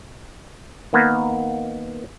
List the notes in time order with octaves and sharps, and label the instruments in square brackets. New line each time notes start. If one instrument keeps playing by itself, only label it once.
[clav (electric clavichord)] D#3 A#3 B3